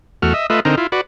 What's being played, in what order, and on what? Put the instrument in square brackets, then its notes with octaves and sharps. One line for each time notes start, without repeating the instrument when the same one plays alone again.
[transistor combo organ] E2 A3 F#4 F6
D#5 E5
A3 F4 B4 D#5 E5
D3 C4 D#4 A#4
E4 F4
F#4 B4 D5